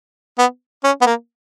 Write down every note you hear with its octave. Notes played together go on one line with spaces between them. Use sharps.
B3
C#4
B3
A#3